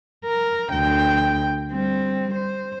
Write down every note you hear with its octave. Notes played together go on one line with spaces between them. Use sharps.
A#4
D2 G5
G3 C4
C5